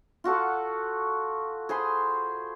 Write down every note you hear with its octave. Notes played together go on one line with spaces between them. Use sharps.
F4 F#4 A4 F#5
G#4 C5 B5 C6